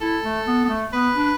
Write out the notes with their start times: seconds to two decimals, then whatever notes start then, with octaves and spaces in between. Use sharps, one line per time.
0.01 E4 A4
0.24 A3
0.47 B3
0.65 B3
0.69 A3
0.92 B3 B4
1.15 D4